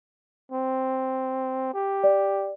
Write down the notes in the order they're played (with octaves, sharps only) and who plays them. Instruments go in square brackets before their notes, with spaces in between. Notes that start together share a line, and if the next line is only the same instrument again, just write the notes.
[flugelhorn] C4
G4
[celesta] D5